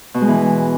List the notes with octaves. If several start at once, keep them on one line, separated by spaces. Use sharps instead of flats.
B2
G#3
E3